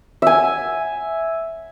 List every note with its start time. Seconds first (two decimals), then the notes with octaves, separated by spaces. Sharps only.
0.22 E5 G#5